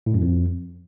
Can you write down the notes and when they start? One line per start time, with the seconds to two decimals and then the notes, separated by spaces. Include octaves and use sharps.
0.06 A2
0.14 F#2
0.22 F2